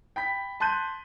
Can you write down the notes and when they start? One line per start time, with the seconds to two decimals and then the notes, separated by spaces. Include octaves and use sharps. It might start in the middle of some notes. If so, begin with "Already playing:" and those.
0.16 G5 B5 B6
0.60 A5 C6 F#6 G6 D#7